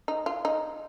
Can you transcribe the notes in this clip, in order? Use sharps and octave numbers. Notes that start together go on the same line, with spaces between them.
D#4
F4
D#4